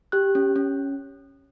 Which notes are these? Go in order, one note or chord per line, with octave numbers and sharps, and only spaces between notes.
G4 F#6
C#4
C#4